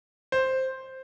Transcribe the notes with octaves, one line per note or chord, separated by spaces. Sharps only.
C5